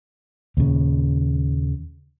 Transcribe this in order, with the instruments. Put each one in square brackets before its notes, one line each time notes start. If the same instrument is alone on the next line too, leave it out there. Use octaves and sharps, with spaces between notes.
[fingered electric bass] D#2 A#2 C#3